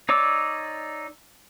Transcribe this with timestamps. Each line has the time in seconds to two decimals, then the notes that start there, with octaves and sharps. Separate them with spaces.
0.09 D#4 C#5 D5 D6 E6